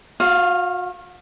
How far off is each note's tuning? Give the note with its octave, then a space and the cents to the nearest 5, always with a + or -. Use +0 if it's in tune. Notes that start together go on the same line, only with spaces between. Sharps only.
F#4 -40 F5 +0